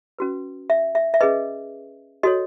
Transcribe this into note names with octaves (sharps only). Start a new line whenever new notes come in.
C#4 F#4 B4
E5
E5
E5
C#4 G#4 B4 D#5
F#4 A4 C#5 D#5